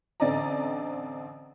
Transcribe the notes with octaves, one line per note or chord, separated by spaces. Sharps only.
A1 D3 C4 D5 D#5 A#5